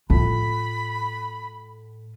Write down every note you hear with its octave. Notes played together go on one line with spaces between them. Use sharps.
A2 F4 B5